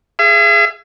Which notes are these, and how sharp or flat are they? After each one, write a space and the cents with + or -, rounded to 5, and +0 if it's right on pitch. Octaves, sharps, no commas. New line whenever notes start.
G#4 +0 E5 +45